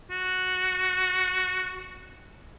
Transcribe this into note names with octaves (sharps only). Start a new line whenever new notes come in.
F#4